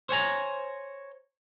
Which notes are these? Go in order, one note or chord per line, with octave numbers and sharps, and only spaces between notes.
C5 C#5 G#5 A#5